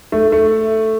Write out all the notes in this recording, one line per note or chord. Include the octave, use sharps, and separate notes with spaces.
A3
A3